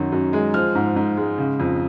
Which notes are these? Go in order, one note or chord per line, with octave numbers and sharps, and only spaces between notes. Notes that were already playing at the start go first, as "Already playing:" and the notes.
Already playing: F#2 D#3 F#3
F#2
G#3
F3 F6
G#2
G#2
G#3
C#3
F2